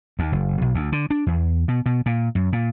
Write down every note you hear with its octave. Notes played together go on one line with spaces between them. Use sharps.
D#2
F#1
B1
D2
D3
D4
E2
B2
B2
A#2
F#2
A#2